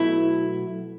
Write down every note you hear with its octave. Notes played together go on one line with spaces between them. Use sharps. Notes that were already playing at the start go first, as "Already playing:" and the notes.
Already playing: B2 F#3 A3 E4